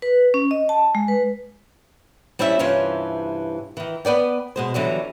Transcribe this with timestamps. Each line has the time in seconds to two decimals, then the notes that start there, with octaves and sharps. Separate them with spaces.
0.02 B4
0.34 C#4
0.51 D#5
0.69 A5
0.95 G#3
1.08 B4
2.39 G3 C4 C#4 E4 E5
2.59 G2 C3 E3 C#4 F4
3.77 D#3 E3
4.05 B3 B4 D5 G5
4.56 B2 G#3 C5
4.74 D3 E3 F#3 G3